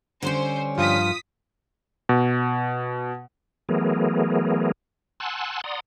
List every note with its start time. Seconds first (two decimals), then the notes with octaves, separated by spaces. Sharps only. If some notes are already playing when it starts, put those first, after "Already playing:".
0.23 D3 G3 C#4 C5
0.78 G2 F3 F4 D#6 B6
2.09 B2
3.69 E3 F#3 A3 B3 G#4 A#4
5.20 F#5 G#5 A5 C6 E6 F#6
5.64 D5 F#5 A#5 C6 D#6